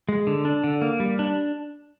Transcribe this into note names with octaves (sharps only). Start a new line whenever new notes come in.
G#3
D3
D4
D3
A#3
G3
D4